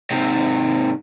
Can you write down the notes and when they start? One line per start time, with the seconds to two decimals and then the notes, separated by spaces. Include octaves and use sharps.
0.11 G#2 C3